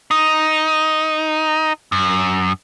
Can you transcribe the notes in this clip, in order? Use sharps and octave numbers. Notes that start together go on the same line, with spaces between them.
D#4
F#2